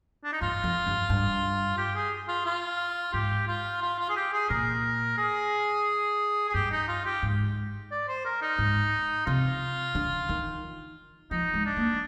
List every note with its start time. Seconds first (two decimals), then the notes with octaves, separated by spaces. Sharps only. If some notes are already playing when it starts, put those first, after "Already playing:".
0.24 D4
0.33 D#4
0.41 G2 F4
0.64 F2
0.87 G2
1.09 G2
1.78 G4
1.95 G#4
2.28 F4
2.46 F4
3.13 G#2 G4
3.47 F4
3.82 F4
3.99 F4
4.09 G#4
4.16 G4
4.33 G#4
4.50 A#2 A#4
5.18 G#4
6.49 G#4
6.54 G2 G4
6.71 D#4
6.88 F4
7.05 G4
7.22 G#2
7.91 D5
8.08 C5
8.25 A#4
8.42 D#4
8.58 G#2
9.26 C3 F4
9.95 D3
10.29 D#3
11.31 F3 D#4
11.54 G#3
11.65 D4
11.77 A#3